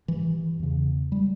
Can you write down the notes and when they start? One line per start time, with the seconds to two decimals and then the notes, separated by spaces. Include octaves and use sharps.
0.08 G2 E3
0.59 E2 C#3
1.12 G3